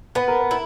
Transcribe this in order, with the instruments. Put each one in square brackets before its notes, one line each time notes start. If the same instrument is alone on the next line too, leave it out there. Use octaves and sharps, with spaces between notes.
[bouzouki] B3 [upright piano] B4
[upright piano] A#4
B4
[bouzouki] E4